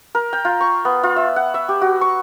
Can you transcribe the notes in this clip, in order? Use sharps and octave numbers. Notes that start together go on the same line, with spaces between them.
A#4
G5
F4
C#6
B3
F4
E5
F#5
E5
G4
F#4
C#6